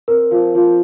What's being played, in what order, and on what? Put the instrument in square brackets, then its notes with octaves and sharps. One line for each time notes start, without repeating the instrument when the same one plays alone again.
[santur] C4 [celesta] A#4
[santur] F3
F3